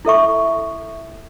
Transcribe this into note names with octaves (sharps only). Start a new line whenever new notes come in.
E4 A4 E5 C#6